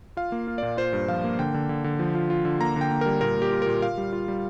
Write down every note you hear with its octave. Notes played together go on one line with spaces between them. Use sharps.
F4 F5
A#3
F4
A#2 D5
F4 C5
G2
F3 F5
A#3
D3 G5
D3
D3
D3
F3
F4
F4
D3
A#3 A#5
D3
G5
A#3
G3 A#4
A#2 A#4
A#2
G4
F4
A#2 A#4
F4 F5
G3
F4
G3